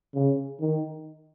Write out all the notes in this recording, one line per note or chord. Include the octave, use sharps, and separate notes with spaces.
C#3
D#3